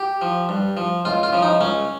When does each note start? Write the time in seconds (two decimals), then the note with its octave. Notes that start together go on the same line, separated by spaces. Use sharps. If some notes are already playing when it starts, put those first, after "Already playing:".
Already playing: G4
0.22 F3
0.49 G2
0.77 F3
1.05 C#2 F4
1.23 F4
1.33 C#3 F3
1.43 D#4
1.61 C#2 C#4